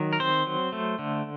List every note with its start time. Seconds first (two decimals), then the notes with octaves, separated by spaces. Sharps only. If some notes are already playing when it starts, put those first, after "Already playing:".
Already playing: D#3 F#3
0.13 A#4
0.20 C4 C5
0.47 F#3
0.72 A3
0.99 D3